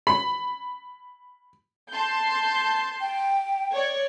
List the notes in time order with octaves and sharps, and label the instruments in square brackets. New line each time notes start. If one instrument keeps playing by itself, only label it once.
[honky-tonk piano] B5
[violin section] A5 C6 G6
[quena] G5
[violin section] C#5 D5